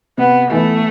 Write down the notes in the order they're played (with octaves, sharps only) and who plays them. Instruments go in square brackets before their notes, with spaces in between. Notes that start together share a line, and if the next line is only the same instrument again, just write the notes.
[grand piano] C3 [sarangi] B3
[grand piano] E3 B3 E4 [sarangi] A3